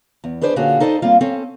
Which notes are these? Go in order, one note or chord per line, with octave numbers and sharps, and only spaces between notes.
E2
D4 G#4 B4 C5 D5
A#2 D3 C#4 F4 F#4 G#4
D#4 A4 C5 D5 D#5
G3 A#3 C4 F4
C4 C#4 A4